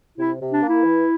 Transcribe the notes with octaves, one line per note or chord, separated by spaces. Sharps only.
C3 E4
C3
D4
A#3
E4
E3